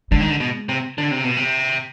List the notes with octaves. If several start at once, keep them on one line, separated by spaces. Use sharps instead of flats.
D3 G#3
D#3
D3
B2
C3
D3
C3
B2
C3